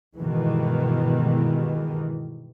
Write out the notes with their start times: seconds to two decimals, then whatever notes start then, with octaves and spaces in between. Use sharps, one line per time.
0.17 G2 B2 D#3 E3 G#3